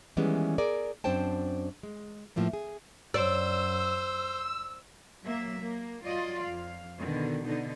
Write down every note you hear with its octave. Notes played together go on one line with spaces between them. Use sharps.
D#3 E3 G3 G#3 B3 C#4
G#4 A#4 D5
F#2 C4 D4 C5 G5 A5
G#3
A2 F3 A3 A#3
G#4
F#2 C5 D5 E6
F#3 A#3 E5
A#3
F#3 F4 D5 D#5
F2 F5
B2 D3 D#3
B2 D3 D#4